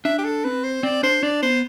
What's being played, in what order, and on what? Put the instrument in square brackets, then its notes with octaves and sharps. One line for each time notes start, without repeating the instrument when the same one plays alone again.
[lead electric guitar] D4 [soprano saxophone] E5
[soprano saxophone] G4
A4
[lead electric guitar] C4 [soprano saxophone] B4
[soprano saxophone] C5
[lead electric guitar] C4 [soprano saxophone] D5
[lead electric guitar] D4 [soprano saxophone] C5
[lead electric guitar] D4 [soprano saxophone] D5
[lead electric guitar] B3 [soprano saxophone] C5